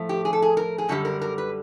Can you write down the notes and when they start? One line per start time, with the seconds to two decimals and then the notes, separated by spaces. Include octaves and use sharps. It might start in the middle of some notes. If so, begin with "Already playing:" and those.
Already playing: A2 F3 A3
0.09 G4
0.25 G#4
0.33 A4
0.42 G#4
0.57 A#4
0.78 G#4
0.89 F#2 D3 G3 A4
1.05 A#4
1.22 A#4
1.38 B4